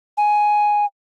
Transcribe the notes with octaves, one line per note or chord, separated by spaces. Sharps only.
G#5